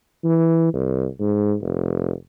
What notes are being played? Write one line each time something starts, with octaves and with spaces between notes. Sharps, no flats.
E3
C2
G#2
F1